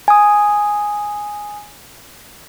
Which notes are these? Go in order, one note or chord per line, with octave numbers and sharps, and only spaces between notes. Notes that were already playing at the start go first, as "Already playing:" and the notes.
G#5 D#6